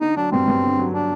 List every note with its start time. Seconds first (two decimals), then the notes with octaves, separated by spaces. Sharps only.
0.01 D3 D#4
0.16 F#3 D4
0.32 G2 C4
0.48 G2
0.64 D3
0.79 F#3
0.94 D4